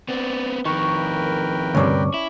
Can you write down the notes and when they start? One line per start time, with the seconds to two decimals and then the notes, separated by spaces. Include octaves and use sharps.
0.09 B3 C4 D5
0.65 F2 D#3 A#4 B4 G5 C#6
1.75 D2 G2 C3 C#4 D5
2.14 E4